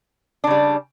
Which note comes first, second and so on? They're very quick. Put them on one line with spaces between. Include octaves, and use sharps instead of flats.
D4 C#3 G3